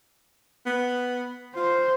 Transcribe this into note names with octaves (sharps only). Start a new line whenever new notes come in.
B3
F4 C5